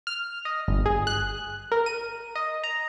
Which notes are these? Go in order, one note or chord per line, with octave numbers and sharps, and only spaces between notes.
F6
D#5
G1
G#4
F#6
A#4
D#7
D#5
A#5